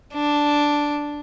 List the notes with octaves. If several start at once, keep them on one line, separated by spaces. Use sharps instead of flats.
D4